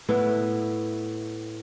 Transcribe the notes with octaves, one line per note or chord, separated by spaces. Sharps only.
A2 B3 E4 B4